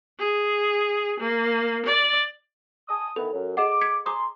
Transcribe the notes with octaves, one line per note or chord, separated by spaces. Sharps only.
G#4
A#3
D5
G#5 A5 D#6
D#3 E3 B3 A4
F#2
G#4 D#5 F#5 D6
G#6 B6 C#7
G#5 A#5 C6 D6 D#6